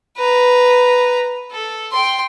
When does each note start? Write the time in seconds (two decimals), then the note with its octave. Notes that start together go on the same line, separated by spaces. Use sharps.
0.17 B4 A#5
1.51 A4
1.92 G5 C6